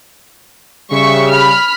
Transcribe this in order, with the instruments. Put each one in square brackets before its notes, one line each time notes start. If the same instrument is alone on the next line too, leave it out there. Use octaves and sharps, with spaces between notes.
[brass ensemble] C#3 G3 [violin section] E5 C#6
[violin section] B5 F6